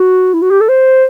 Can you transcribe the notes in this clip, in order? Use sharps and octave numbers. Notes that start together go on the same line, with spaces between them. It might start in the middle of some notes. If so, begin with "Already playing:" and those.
Already playing: F#4
E4
F#4
G4
A4
C5